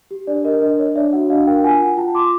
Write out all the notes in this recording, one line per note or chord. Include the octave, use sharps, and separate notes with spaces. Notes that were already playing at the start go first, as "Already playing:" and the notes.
G4
D4 D5
A#4 D#5
D4 D#5
C#5 D#5
D4 D5 E5
F#4 E5 F#5
D4 D#5 F5
A#4 F5 G5
F4 F#5 G#5
F4 F#5 G#5
F4 G5 A5
F4 C6 D6